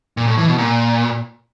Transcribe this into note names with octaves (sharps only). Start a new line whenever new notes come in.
A#2
A2
E3
B2
A#2